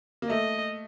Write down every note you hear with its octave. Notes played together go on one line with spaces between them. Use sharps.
A#3
A3 D#5